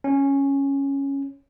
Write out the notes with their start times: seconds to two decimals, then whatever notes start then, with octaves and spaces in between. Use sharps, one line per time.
0.04 C#4